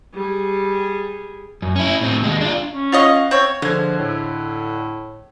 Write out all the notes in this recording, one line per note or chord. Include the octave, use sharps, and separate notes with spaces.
G3 G#4
F#2
C#4 E4
A2 C4
D#2 G#3
D4 F4
C#4
F4 C#5 D#5 F5 F#5
C4 C#5
D3 F3 G#3 G#6
A2